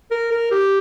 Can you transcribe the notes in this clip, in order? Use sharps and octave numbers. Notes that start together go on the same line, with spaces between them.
A#4
A#4
G4